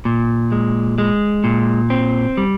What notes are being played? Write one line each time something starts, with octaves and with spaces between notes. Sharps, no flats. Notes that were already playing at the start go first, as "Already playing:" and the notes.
A#2
G#3
G#3
A#2
C4
G3